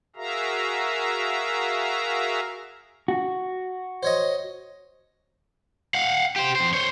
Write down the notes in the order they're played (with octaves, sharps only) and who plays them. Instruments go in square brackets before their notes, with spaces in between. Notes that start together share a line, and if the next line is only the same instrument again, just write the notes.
[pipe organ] F#4 G#4 A#4 E5 F5 A#5
[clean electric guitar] F#4
[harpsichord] C5 C#5 D#5
[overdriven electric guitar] F5 F#5
G4 C5
F2 C5
C5 C#5